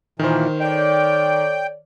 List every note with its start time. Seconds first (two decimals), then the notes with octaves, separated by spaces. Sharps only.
0.19 A#2 D#3 E3 A#4 C5
0.60 A4 C#5 D5 G5